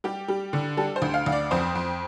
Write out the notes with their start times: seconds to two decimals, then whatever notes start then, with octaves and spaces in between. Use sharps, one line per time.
0.04 G3 G4
0.28 G3
0.53 D3
0.77 G3 A4
0.96 C5
1.02 D2
1.14 F5
1.26 D2
1.32 D5
1.51 F2 C5
1.75 F2